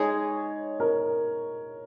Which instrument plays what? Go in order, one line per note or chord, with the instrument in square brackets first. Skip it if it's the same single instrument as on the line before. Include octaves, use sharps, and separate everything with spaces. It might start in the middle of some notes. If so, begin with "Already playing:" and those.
Already playing: [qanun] G#3 D#4 G#4 [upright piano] C#5
[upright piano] A#4